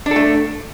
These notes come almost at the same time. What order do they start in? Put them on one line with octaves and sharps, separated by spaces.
D4 A4 A3